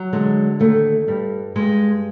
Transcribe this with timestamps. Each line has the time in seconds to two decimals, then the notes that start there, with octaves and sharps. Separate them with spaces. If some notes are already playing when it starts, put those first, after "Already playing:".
Already playing: F#3
0.13 D3 G#3
0.60 D#2 A3
1.08 G2 G3
1.55 G2 G#3